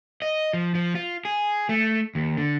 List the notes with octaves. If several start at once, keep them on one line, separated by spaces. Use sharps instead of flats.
D#5
F3
F3
F4
G#4
A3
D#2
D3